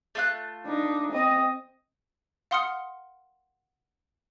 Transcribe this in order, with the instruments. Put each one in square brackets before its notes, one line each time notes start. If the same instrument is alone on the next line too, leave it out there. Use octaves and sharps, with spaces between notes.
[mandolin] A3 F4 F#6
[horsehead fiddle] D4 D#4
C4 D#5
[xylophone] F5 F#5 C6 D#6 F6 C#7